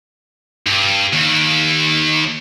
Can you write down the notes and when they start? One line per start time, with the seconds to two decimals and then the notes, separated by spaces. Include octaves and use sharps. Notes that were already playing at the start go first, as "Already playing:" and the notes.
0.66 G2
1.13 D#2